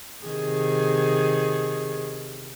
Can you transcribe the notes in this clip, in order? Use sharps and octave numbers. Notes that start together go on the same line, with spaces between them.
C3 D#3 G#4